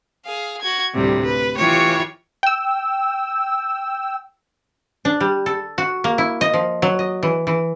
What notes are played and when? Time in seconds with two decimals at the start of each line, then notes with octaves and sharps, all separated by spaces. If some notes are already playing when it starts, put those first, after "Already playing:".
0.25 G#4 F5
0.62 F#4 G#6
0.93 D2 A2 C3 G3
1.25 B4
1.57 E3 F4 G4 C#5 C#6
2.43 G5 E6
5.05 D4
5.20 G3
5.46 A4
5.78 F#4
6.04 A#3
6.18 E4
6.41 D#5
6.54 F3
6.82 F#3
6.99 D#5
7.23 E3
7.47 E3